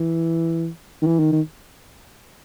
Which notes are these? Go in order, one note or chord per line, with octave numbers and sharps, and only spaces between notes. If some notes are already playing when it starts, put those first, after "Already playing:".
Already playing: E3
D#3
E3
D#3
D#3